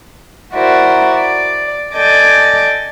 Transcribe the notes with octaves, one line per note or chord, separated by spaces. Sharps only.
E4 F#4 A#4 C5 D5
D5
A4 D5 D#5 G5 G#5 D6